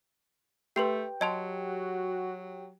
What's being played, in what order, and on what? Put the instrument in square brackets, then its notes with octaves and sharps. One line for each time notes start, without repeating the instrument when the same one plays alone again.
[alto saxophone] A3 [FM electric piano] G4 G5 [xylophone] B4 C6 C7
[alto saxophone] F#3 [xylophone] D#5 A5 C6
[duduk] F#4